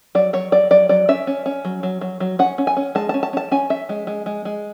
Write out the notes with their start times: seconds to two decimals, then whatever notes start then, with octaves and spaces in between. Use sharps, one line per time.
0.15 F#3 D5
0.33 F#3 C#5
0.52 F#3 D5
0.71 F#3 D5
0.89 F#3 D5
1.09 C#4 E5
1.27 C#4
1.46 C#4
1.65 F#3
1.83 F#3
2.01 F#3
2.20 F#3
2.39 C#4 F#5
2.58 C#4
2.67 G#5
2.77 C#4
2.95 G#3 A5
3.09 A5
3.14 C#4
3.23 A5
3.33 C#4 A5
3.51 C#4 G#5
3.70 C#4 E5
3.89 G#3
4.07 G#3
4.26 G#3
4.45 G#3